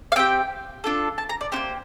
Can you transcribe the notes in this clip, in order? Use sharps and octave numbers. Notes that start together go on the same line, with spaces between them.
F5
C4 G4 G5
D4 F4 A4
A5
A#5
D5
A#3 D4 G4 C5